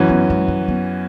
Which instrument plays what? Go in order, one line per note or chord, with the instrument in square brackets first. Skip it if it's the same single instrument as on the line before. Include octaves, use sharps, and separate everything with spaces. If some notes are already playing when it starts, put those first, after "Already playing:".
Already playing: [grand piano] F#2 E3 C#4 F#4
[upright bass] B3
G#3
F#3
B3